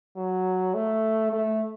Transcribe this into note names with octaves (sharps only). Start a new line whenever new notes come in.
F#3
A3
A3